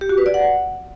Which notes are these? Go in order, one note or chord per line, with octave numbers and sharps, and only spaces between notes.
G4
F#4
B4
D5
F#5